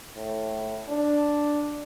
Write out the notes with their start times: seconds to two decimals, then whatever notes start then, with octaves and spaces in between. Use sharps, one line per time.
0.17 A2
0.89 D4